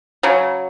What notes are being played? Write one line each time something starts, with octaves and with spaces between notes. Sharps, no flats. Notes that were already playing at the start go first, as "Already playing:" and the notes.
C#3 F#3